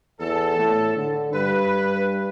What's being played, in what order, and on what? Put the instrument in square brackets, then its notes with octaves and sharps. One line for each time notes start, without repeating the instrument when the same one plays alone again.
[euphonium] E2 [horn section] A4
[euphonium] A2
D3
[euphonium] G2 [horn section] B4